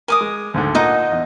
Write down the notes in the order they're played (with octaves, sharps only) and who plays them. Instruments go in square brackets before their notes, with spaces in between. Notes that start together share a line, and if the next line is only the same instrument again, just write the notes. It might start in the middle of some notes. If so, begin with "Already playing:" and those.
[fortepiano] A#4 [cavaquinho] G#5 D6 D#6
[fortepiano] G#3
D2 G#2 D3
[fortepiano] A#2 [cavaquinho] D#4 D#5 F#5
[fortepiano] E2